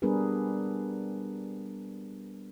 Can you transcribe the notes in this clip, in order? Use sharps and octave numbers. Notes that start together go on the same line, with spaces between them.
G3 B3 D4 G#4 A#4 B4